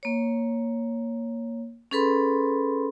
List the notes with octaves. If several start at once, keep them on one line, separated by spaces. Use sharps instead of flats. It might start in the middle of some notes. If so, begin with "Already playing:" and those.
A#3 C#5
C#4 G#4 A4 B4 B5 C6